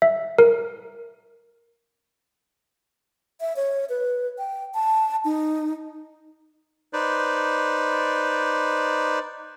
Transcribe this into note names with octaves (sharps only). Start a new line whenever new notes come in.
E5
A#4
E5
C#5
B4
G5
A5
D#4
D#4 B4 C5 D5